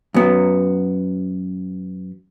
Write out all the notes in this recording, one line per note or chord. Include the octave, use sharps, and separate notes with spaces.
F#2 B3